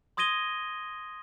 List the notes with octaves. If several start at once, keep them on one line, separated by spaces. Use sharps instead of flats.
C6 D#6 G#6 A#6 D#7 G7